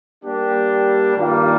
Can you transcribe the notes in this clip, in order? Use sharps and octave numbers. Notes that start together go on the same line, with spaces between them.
G3 A#3 D4 G4
G2 D#3 G3 A#3 F4